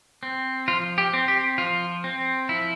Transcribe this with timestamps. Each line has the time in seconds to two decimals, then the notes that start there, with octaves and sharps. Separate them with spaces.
0.23 C4
0.68 F3 F4
0.98 G4
1.14 C4
1.28 G4
1.58 F3 F4
2.04 C4
2.49 F3 E4